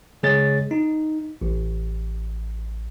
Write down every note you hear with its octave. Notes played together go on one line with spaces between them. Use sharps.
C#3 G#3 G#4 C#5 A6
D#4
A1